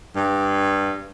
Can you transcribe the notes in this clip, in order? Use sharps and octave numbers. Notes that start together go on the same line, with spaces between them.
G2